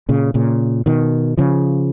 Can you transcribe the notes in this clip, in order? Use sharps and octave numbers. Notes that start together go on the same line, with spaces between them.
A#2 C#3
A#2 C#3
B2 D#3
C#3 F3